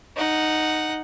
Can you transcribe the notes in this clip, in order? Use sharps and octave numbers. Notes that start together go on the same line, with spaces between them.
D#4 F#5